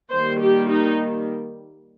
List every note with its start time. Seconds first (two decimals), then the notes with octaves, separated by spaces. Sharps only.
0.10 D#3 G3 A#3 C5
0.40 G4
0.69 D#4